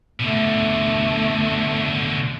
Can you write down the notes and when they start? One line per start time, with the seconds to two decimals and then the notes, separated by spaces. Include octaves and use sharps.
0.20 B2 D3 A3